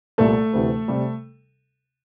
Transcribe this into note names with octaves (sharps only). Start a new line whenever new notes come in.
C2 A#2 G3 A3 A4
D2 C3 E3
C3 G3